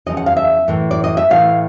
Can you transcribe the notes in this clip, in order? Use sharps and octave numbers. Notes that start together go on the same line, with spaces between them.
E2 C#3 F3 D#5
F#5
F5
E5
A2 E3
D5
D#5
E5
A2 E3 F5